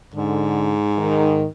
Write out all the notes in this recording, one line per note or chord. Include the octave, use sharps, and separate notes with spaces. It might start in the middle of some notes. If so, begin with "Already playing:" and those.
G#2 D3
D#3